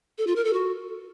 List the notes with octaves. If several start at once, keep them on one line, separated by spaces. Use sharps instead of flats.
A4
F4
A#4
A4
F#4